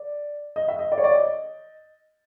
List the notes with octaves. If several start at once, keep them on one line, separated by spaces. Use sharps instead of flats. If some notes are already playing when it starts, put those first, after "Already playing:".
Already playing: D5
D#5
E5
D#5
D5
C#5
D5
D#5